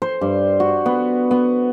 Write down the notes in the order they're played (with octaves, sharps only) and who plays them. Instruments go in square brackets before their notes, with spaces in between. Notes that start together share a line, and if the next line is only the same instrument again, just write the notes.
[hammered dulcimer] C5
G2
F#4
B3
B3